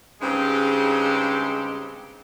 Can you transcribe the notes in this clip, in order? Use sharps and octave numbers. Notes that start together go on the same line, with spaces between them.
G2 C#3 G#3 C4 D#4 G4